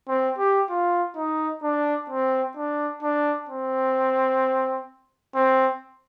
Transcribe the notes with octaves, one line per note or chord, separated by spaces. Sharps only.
C4
G4
F4
D#4
D4
C4
D4
D4
C4
C4